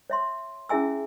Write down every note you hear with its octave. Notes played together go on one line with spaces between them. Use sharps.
C#5 E5 C6
C#4 E4 G#4 E5 G#5 E6